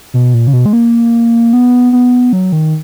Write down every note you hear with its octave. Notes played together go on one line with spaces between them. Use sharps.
B2
A#2
C#3
B2
G#3
A#3
B3
B3
F#3
D#3